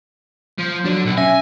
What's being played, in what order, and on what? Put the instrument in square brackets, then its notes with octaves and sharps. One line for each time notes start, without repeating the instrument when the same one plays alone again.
[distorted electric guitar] F3
[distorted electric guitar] D3 D4 [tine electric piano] F#3
[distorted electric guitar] B2 A4
[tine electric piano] C#4 E5 A#6 [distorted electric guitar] G#5